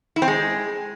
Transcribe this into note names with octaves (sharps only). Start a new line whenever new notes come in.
E4
C4
G#3